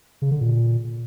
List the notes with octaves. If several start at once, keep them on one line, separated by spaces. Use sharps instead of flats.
C#3
D3
A#2